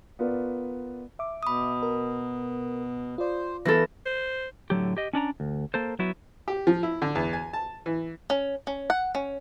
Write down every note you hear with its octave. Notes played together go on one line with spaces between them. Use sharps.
B3 F4 A#4 B4 D5
E5 D6
B2 B5 D#6
A#4
F4 C5 D5
E3 B3 E4 A4 A#6
C5
A2 D3 F#3 G4
G4 D#5
C#4 D4 D5 A#5
D2
A#3 A4 C5
F#3 B3 E4 F#4
G4
F3
E4
D3
E2
G#5
A5
E3
C#4
C#4
F#5
C#4